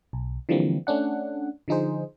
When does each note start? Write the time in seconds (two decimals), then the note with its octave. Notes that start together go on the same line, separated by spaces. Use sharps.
0.13 B1
0.49 D3 E3 F3 G3 A#3 C4
0.87 A3 C#4 D4 F#5
1.68 D3 F3 D#4 G#4 C5